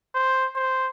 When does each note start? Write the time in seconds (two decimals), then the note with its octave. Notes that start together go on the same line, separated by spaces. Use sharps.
0.15 C5
0.55 C5